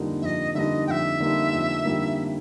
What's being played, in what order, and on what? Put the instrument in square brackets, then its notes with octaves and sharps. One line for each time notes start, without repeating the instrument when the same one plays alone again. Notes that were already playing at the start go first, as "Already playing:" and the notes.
Already playing: [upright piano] F2 D3 G3 A#3 D#4
[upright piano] F2 [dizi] E5
[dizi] D#5
[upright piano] D3 G3 A#3 D#4 [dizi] D#5 E5
[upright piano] F2 [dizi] G5
[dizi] E5
[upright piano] D3 G3 A#3 D#4
F2
D3 G3 A#3 D#4